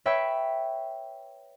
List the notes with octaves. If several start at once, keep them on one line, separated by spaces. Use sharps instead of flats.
B4 C#5 E5 G5